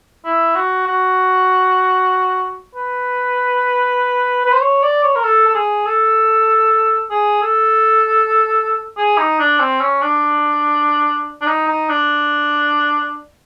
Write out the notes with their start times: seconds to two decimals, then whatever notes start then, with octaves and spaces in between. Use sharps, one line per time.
0.25 E4
0.56 F#4
0.87 F#4
2.75 B4
4.45 B4
4.53 C5
4.61 C#5
4.82 D5
5.03 C#5
5.16 A#4
5.24 A4
5.48 A4
5.55 G#4
5.86 A4
7.11 G#4
7.42 A4
8.97 G#4
9.18 D#4
9.40 D4
9.59 C4
9.81 C#4
10.02 D4
11.41 D4
11.47 D#4
11.68 D#4
11.89 D4